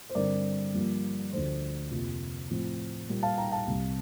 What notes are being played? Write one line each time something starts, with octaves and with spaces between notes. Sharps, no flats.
C5
G2 D3 G3 C4 A#4 D5
G2 F3 A#3
D2 D3 F3 A3 C5
F2 C3 F3 A#3
A2 F3 C4
A#2 G3 A#3
F5 A5
G5 A#5
F5 A5
C2 C3 G3